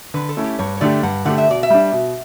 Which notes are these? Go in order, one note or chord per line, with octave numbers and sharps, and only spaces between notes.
D3 B4
A4
A3 C#4 E4
G4
G2 C#5
C#5
D3 A3 D4 G4 D5
G2 F#5
D3 A3 D4 G4 F#5
E5
B2 D5
E5
G3 D4
B2